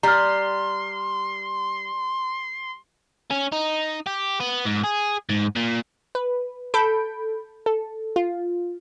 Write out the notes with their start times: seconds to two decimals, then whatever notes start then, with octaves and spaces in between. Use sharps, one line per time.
0.03 G3 A#5 C6 F6
3.31 C#4
3.52 D#4
4.06 G4
4.40 B3
4.65 G#2
4.84 G#4
5.29 G#2
5.56 A#2
6.15 B4
6.74 A4 B5 G6 D7
7.66 A4
8.16 F4